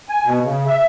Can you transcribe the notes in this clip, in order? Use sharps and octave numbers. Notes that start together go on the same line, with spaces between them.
G#5
B2
C#3
E5